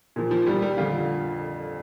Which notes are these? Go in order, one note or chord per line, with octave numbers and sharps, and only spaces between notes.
A#2 F3
F3
A#2 F3 G3
G3
F2 D3 F3 F4